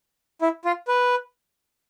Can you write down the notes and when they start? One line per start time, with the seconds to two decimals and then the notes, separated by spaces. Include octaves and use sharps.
0.42 E4
0.65 F4
0.88 B4